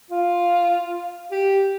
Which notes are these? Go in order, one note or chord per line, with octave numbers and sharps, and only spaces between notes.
F4
G4